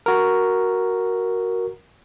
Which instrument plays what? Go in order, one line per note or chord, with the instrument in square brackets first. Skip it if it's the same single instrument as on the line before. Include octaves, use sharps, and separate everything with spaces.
[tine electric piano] F#4 A#4